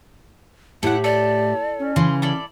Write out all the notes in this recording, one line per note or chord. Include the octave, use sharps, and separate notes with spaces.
A2 E4 G4 A4 F#5
A4 D5
C#4
C#3 E3 C6
E4 A4 D5